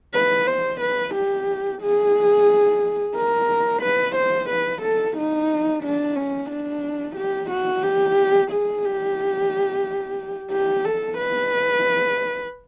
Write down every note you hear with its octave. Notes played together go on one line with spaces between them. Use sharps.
B4
C5
B4
G4
G#4
A#4
B4
C5
B4
A4
D#4
D4
C#4
D4
G4
F#4
G4
G#4
G4
G4
A4
B4